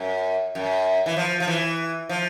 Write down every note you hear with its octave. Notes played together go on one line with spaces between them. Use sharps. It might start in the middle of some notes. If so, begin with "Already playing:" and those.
Already playing: F#2
F#2
E3
F3
F3
E3
F3